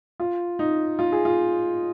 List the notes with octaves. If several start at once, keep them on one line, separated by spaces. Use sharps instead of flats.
F4
D#4
F4
G#4
F4